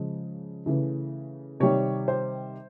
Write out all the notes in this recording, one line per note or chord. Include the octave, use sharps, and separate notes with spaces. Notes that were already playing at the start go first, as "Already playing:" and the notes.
Already playing: C#3 F3 G#3
C#3 E3 A3
C3 D#3 G3 C#5
C5